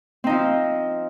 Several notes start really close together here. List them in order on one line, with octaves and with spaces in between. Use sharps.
C4 D#4 F3